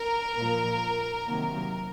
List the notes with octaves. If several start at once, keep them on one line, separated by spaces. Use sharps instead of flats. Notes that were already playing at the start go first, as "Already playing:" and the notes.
Already playing: A#4
A#2 F3 A#3
C3 D#3 F#3 A#3